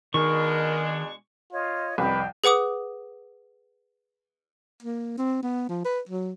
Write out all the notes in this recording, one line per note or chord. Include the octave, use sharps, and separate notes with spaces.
B2 D#3 G#3 D4 A#4 C#6
F4 C#5 D#5
C2 F2 B4 D5 D#5 G5
G#4 B4 F#5 D6 D#6
A#3
C4
B3
F3
B4
F#3